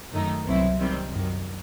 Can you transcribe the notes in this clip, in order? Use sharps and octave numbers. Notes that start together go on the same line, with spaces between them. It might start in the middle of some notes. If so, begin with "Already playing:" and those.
F#2 D#3 A3 D#4
C2 B2 F#3 C4 E4
C3 D#3 G3 C4
F#2 D#3 F#3